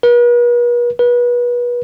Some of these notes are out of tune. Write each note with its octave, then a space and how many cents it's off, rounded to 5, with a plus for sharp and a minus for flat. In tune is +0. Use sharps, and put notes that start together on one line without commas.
B4 -45
B4 -30